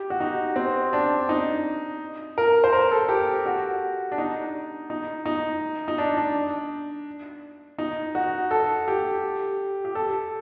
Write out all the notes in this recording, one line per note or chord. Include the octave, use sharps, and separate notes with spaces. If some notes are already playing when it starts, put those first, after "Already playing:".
Already playing: G4
F#4
D#4
C4
D4
D#4
A#4
C5
A#4
A4
G4
F#4
D4
D#4
D#4
D#4
D#4
D4
D4
D#4
F#4
A4
G4
G4
A4